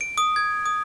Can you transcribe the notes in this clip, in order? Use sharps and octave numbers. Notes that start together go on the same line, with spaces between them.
D7
D#6
G#6
D#6